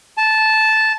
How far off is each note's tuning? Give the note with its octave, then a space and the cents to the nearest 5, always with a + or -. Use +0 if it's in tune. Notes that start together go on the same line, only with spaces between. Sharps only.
A5 -10